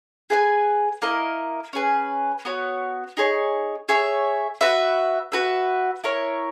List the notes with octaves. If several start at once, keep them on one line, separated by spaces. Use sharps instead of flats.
G#4 B4 E5 G#5
A#3 E4 A#4 D#5
C#4 G#4 B4
B3 F#4 C#5
D#4 G#4 C#5
G#4 C#5 E5
F#4 B4 E5
F#4 B4 E5
E4 A#4 C#5